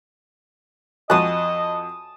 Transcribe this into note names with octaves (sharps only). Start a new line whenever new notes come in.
F2 F#4 D#5 A5 D#6 F#6